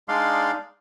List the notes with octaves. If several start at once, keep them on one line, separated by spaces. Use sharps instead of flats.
G#3 D4 D#4 D5 F5 C6